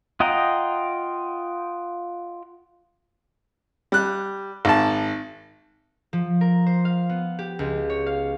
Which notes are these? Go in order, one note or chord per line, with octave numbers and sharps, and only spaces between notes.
F4 D#5 F#5 G5 A#5
G3 F#6
G#1 A5
F3
A#4
C5
F5
B3
G4
C#2
C#5
F5